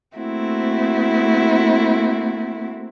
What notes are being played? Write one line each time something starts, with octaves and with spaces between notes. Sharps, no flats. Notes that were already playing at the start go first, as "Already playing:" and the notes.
A3 A#3 C4 E4 F#4